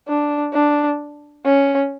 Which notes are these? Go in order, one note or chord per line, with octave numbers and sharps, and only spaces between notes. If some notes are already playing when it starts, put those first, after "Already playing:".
D4
D4
C#4